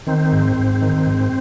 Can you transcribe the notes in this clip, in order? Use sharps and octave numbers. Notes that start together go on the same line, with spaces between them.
D#3 C4
G#2
G#2
D#3
G#2